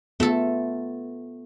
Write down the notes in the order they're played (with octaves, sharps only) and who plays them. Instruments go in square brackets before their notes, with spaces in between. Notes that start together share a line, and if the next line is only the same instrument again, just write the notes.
[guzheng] A3 A4 [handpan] B3 F4